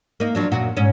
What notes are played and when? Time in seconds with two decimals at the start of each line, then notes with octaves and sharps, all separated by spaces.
0.20 A#3 D#4
0.35 F3 F#3 D4
0.51 F#2 A#2 F#4
0.77 G#2 C#4